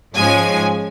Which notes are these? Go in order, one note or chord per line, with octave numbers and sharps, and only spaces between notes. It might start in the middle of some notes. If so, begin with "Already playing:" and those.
G#2 F3 G#3 C#4 G#5